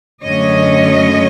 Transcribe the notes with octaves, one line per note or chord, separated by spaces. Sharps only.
F#2 D3 F#3 A3 C#4 C#5 D#5